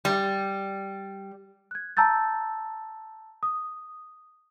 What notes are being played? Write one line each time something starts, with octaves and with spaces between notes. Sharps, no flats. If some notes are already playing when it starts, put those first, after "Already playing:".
G3
F#6 G#6
A5 A#5 E6 G6 A6
D#6